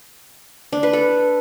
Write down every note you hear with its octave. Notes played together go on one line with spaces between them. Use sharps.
D4
B4
A4